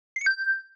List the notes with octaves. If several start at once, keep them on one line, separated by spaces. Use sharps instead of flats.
C7
C#7
G6